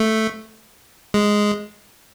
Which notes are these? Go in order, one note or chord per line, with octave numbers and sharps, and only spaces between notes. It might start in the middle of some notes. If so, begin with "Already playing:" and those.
Already playing: A3
G#3